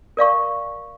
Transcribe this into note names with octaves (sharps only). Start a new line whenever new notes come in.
A#4 D5 F5 C#6